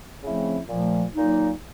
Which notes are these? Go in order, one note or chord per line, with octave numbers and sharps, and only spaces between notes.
C#3 F3 A3 C4 E4
A#2 F3 A3
A#2 F#3 A#3 D#4